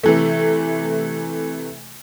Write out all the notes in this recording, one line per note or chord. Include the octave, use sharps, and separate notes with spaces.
C3 E3 A3